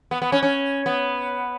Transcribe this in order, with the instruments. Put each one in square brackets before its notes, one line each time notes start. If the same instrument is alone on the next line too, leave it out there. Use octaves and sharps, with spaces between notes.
[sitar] B3
B3
C#4
C#4
B3